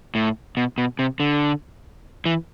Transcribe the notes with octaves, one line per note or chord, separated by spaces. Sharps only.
A2
B2
B2
C3
D3
E3